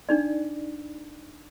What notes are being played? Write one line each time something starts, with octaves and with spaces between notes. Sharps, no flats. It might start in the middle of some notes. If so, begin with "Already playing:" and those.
D4 D#4 D5